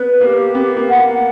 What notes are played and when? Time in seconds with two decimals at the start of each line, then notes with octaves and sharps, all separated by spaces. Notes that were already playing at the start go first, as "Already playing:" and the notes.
Already playing: B3 B4
0.21 A#3 G4
0.54 B3 G4
0.77 A#3
0.88 F#5
0.99 A#3